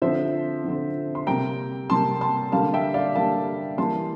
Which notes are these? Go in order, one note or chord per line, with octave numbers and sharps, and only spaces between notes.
D3 F3 C4 C5 E5
D3 F3 C4
C6
C3 G3 A#3 G5 A#5
C3 G3 A#3 A5 C6
A5 C6
D3 G3 A#3 F5 A5
E5 G5
D5 F5
D3 G3 A#3 F5 A5
E3 G3 A#3 A5 C6